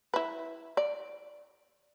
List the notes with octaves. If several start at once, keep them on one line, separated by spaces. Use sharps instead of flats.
E4 B4
D5